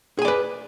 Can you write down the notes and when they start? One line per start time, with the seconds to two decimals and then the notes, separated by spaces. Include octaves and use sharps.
0.19 G#4
0.22 G#5
0.25 D5
0.28 B4